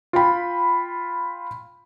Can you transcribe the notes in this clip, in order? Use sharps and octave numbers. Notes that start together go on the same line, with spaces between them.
F4 G5 B5